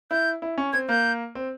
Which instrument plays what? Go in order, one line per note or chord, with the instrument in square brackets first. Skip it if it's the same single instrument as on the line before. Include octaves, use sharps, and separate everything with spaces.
[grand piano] E4 [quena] G6
[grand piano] E4
C#4
[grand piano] C4 [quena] G#6
[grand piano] A#3 [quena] G6
[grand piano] C4